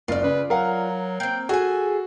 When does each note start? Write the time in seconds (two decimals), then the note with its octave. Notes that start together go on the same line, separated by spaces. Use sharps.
0.08 F#1 F4 D5
0.23 C#3 B4
0.50 F#3 A#4 F5 F#5
1.20 A#3 C4 G5
1.49 F#4 G#4 A4 G#5